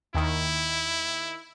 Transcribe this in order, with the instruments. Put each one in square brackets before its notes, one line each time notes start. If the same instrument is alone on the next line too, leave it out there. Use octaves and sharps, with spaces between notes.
[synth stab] D#2 D#3 [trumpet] E4